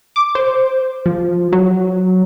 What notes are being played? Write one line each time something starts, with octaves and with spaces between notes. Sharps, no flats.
D6
C5
F3
F#3